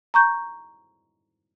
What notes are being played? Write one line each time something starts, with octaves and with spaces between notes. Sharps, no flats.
A#5 C#6 G6